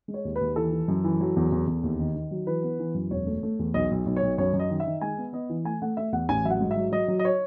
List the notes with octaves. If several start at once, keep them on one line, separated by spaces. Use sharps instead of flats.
G#3
C#5
D#2
B4
D#2
E3 A4
E3
F#2
E3
F#3
E2
E2
E2
D#2
D#3
D#3
F#3
E3 B4
B3
E3
F#2
E1 C#5
A3
A3
E2
B1 D#5
B1
B1
C#5
B1
F#2 C#5
F#2
D#5
D#3
E5
D#3
G#3 G#5
B3
B3 D#5
E3
A3 G#5
A3 F#5
A3 E5
E2 F#5
A1 G#5
F#3 E5
F#5
G#2
E5
F#3
F#3 D#5
F#3
D#5
C#5